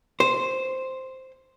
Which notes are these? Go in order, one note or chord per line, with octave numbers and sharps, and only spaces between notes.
C5